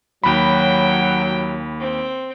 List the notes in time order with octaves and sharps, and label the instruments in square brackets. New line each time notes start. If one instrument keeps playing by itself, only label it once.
[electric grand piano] D#2 B5 [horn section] F#3 [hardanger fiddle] G5
[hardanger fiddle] C4